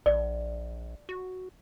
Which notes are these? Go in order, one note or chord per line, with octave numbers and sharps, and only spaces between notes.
A#1 D5
F#4